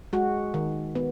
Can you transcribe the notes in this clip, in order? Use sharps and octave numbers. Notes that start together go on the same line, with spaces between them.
G#3 F#4
D#3
B3